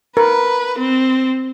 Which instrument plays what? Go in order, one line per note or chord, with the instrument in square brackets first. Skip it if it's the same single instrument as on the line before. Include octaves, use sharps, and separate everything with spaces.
[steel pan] A#4 [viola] B4
[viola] C4